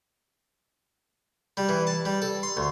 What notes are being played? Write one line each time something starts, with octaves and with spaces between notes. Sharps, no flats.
G3
E3
A5
G3
A4
C6
D2